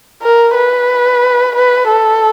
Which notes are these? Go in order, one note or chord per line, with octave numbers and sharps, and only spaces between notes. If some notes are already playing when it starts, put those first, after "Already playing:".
A#4
B4
B4
A4